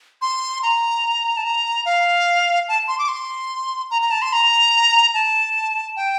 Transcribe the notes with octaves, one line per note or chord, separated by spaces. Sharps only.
C6
A#5
A5
A#5
F5
A5
C6
D6
C6
A#5
A#5
A5
C6
A#5
A5
G5